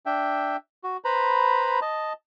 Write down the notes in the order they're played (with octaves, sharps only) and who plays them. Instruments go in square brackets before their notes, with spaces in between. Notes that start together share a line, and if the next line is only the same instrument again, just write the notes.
[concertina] D4 E5 G5
F#4
B4 C5 A#5 B5
D#5 A5